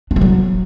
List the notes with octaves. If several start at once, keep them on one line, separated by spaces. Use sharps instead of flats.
D4
A3
F#3